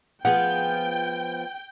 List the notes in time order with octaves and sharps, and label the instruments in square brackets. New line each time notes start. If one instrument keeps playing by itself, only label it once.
[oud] F3 B3 G#4 [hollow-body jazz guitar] F#5 [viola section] G5